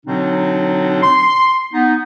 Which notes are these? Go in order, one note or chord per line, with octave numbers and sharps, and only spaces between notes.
B2 D3 F#3 C4 D4 D#4
C6
B3 D#4